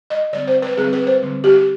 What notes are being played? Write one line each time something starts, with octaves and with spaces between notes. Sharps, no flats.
D#5
D3 G3 C4 D5
C5
B4
D3 G3 C4 G#4
B4
C5
D3 G3 C4
G4